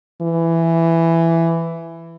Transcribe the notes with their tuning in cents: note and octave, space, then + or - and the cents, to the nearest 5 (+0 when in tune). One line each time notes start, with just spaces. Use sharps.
E3 +10